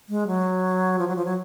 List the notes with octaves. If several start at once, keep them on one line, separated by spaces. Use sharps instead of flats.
G#3
F#3
F3
F#3
F3
F#3